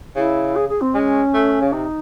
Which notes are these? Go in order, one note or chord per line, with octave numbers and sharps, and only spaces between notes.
C#3 E4
G#4
G#4
C4
G#3 C#4
A3
C#3
C3 D#4